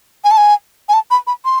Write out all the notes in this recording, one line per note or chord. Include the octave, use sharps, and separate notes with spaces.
G#5
A5
G#5
G#5
A5
B5
B5
C6